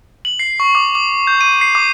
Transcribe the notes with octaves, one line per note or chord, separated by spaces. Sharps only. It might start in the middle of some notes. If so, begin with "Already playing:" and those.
F#7
C7
C#6
D6
D6
G6
D#7
C7
D6